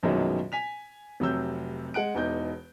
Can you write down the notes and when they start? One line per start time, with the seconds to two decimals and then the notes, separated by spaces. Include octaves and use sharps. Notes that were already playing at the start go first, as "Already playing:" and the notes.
0.03 A#1 F#2 B2 D#3 F#3 G#3
0.52 G#5 B6 F7
1.20 F1 C3 F#3 E6 G6
1.94 G#3 F#5 F#6 D7
2.15 E1 E2 D#4 G6